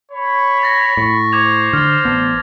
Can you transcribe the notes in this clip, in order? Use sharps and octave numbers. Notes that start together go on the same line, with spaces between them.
C#5 B5
A6 A#6
A2 C#6
C5 D6 G#6 F7
D3 F6 A6
A1 B3 D4